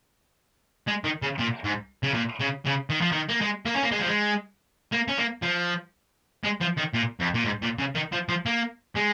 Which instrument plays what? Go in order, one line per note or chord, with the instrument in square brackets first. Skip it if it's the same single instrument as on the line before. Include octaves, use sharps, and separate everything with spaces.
[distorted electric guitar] G#3
D#3
C#3
A#2
G#2
C#3
A#2
C#3
C#3
D#3
F3
D#3
A#3
G#3
A#3
C#4
A#3
G#3
F3
G#3
A#3
C#4
A#3
F3
G#3
F3
D#3
A#2
F2
A#2
G#2
A#2
C#3
D#3
F3
F3
A#3
G#3